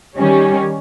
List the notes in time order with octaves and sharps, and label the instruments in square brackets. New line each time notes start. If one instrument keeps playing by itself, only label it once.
[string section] D#3 G3 C#4